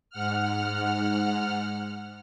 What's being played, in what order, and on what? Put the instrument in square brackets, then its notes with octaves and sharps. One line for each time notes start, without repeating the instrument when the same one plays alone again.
[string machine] G#2 F#5 F6